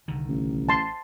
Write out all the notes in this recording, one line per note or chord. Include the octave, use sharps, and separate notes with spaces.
C2 D3 D#3
A1
A5 C6